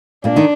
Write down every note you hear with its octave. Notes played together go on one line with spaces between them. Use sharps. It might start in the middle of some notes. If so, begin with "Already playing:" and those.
A#2 A#3 D4
D#3 D#4